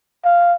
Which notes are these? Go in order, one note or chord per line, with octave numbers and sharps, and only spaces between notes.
F5